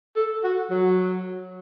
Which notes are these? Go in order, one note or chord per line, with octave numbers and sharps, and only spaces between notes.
A4
F#4
F#3